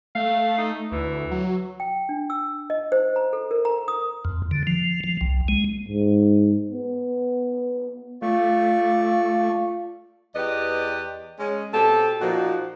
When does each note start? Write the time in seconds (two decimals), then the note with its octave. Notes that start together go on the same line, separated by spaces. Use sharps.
0.15 A3 F5
0.58 D#4
0.92 D2 E3
1.31 F#3
1.80 G5
2.09 D4
2.30 E6
2.70 D#5
2.92 C5
3.16 A#5
3.33 A4
3.51 A#4
3.65 A#5
3.88 D#6
4.25 F2
4.51 D3
4.67 F3
5.04 F3
5.21 C2
5.48 G#3
5.88 G#2
6.71 B3
8.22 A3 F4 D5 C#6
10.35 E2 G4 B4 D5 D#5
11.40 G#3 C#4
11.74 B2 C4 G4 A4
12.21 A#2 F3 D#4 F#4